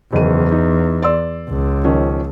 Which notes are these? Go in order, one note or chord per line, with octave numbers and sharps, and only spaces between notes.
F#1 E2 D#3 D#7
D#4
D5 C6 E6
C#2
D#3 F3 C#4